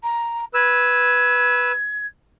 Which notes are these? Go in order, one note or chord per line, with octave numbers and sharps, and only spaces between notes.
A#5
B4 E6 G#6